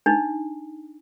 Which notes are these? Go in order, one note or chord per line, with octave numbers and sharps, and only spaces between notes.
D4 D#4